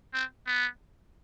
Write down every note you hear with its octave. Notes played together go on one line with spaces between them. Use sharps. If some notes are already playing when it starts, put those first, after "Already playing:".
C4
B3